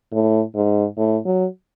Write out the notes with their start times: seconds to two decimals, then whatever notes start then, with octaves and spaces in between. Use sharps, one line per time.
0.12 A2
0.55 G#2
0.97 A2
1.25 F#3